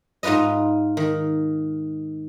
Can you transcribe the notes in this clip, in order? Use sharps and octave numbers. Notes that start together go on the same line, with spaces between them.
G#2 D#4 F4 B4 D#5
D#3